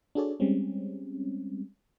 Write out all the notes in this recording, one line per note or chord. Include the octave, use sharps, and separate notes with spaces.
D4 F#4 G#4 A4 C#5 D5
G3 G#3 C4 C#4